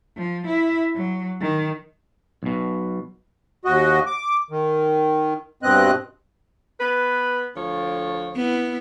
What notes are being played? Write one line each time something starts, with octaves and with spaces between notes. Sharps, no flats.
F3
E4
F#3
D#3
B1 B2
D#2 F#4 D#5
D6
D#3
G2 B2 C4 D#5 F#6
B3 B4
D2 F3 C#5
B3 E4